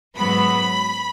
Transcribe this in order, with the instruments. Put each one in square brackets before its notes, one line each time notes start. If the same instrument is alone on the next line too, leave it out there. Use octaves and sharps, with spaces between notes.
[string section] G#2 F#3 B3 B5